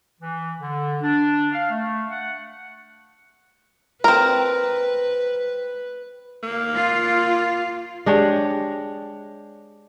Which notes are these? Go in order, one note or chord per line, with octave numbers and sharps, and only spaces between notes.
E3
D3
D4
F5
A3
F#5
C4 A#4 B4
A#3
F4
G#3 D4 G4 C#5